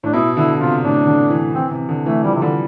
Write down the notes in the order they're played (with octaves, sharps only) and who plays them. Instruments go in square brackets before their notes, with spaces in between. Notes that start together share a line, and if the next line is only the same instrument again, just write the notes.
[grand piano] A2 [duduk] D4
[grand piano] B2 [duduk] E4
[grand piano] D3 [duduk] E4
[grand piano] C3 [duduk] F4
[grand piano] A2 [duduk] D4
[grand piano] D3
E3
[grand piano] E3 [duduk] C4
[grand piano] C3
D3
[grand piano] E3 [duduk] A3
[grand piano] F3 [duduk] G3
[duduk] C3
[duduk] D3 [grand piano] G3